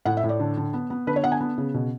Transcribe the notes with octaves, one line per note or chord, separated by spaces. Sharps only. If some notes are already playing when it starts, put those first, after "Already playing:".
A2 F#5
E5
A2
D5
D3
D3
B3
B3
D3 B4
C#5
B3 F#5
G#5
B3
C#3
B2